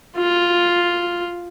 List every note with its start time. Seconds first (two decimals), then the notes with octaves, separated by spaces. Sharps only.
0.17 F4